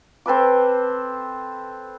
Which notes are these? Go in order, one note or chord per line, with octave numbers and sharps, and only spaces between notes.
C4 A4 B4 D6